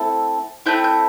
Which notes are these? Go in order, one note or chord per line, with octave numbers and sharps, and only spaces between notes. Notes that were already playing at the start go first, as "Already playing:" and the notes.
Already playing: A3 C4 E4 A4
A3 C4 E4 G6
G6